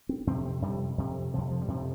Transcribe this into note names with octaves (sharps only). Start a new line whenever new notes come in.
C4
F2 C3 C4
C4
F2 C3 G3
F2 C3
F2 C3 F3
F3
G3
F2 C3 F3